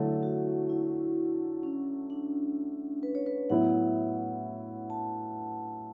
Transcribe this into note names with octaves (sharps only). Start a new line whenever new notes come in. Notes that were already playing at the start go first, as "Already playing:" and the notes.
Already playing: D3 F#3 A3 E4
F#4
E4
C#4
D4
B4
C#5
B4
A2 F#3 B3 E4 F#5
A5